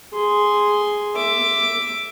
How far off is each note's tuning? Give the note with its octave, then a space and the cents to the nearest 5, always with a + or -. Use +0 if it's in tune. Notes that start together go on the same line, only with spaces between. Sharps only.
G#4 +0 C6 -5
E5 +5 D6 +0